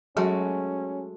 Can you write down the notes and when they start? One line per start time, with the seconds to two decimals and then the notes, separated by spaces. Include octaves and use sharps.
0.17 F#3 G#3 A3 C#4 F#4